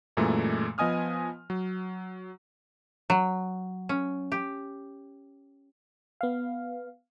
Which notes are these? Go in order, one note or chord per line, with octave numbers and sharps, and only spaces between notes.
F#2 A#2 E3 G#3 A3
F3 B3 D#5 G#5 D#6 F6
F#3
F#3
C#4
G4
B3 F5